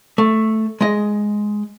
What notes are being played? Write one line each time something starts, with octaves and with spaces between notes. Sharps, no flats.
A3
G#3 D#5